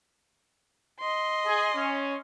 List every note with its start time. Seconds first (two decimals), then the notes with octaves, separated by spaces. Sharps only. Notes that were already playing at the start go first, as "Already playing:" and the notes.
1.00 D#5 C6
1.45 G#4
1.74 C#4